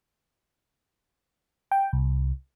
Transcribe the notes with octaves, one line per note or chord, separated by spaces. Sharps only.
G5
C2